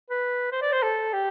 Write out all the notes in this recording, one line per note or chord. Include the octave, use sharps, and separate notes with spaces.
B4
C5
D5
C5
A4
G4